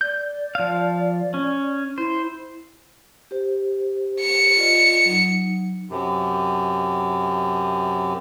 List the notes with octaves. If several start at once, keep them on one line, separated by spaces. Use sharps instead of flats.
D5 G6
F3 F5
C#4
E4 C5
G4 C5
C#7
F4 D5 D#5
F#3 D#4
F#2 C3